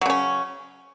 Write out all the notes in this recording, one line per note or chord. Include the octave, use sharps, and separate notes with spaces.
C#3 F#3 C#4